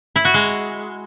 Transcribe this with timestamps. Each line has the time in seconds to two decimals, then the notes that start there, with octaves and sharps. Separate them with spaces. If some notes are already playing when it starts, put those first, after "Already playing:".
0.16 E4
0.25 F#4
0.34 G#3